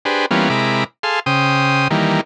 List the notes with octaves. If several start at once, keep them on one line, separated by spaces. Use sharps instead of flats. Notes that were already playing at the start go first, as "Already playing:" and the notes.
D4 G4 G#4 B4 C5
E3 G3 A#3 B3 C#4 F4
C3 G#3 E4 A#4 B5 D6
G#4 A4 F5 C6
C#3 C5 G5 D#6
D#3 E3 G3 A#3